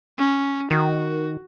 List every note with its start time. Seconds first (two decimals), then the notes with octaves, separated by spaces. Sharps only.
0.18 C#4
0.71 D#3 F#4